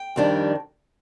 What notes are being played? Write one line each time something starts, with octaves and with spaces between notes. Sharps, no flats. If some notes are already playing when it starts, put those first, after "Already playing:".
Already playing: G5
F2 D#3 G3 D4